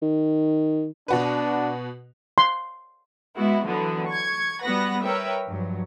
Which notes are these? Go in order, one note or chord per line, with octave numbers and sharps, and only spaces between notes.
D#3
B2 D4 F#4 B4
C6
G#3 B3 E4 F#4
D3 E3 F#3 B3
C#6 G#6
G3 B3 F#4 B4 F#5 A#6
A#4 B4 C#5 E5 G5
G2 F3 F#3